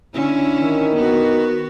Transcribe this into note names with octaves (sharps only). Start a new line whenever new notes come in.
D3 C#4 E4
D#3
B3 F#4